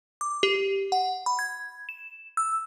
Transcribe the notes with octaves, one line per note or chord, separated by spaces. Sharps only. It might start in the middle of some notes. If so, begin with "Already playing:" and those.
D6
G4
F#5
B5
G#6
E7
E6